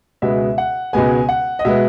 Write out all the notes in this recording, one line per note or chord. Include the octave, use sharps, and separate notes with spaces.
C#2 B2 G#3 B3 E5
F#5
C#2 B2 G#3 B3 G#5
F#5
D#5
B2 G#3 B3 E5